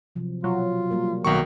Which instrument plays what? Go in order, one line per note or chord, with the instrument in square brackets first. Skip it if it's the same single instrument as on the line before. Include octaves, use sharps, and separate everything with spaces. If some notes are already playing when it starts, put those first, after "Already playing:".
[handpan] C3 F3 F#3
[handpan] B2 [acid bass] F#3 [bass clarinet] F4
[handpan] G3 A#3 A#4
[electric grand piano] B1 F#4 C#6 [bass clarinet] D#3 [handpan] A#3 G4 A#4